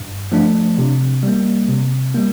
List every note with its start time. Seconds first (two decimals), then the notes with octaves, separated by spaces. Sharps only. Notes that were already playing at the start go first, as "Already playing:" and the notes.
Already playing: G2
0.32 F3 A3 D4
0.78 C3
1.23 G3 A#3
1.68 C3
2.14 G3 A#3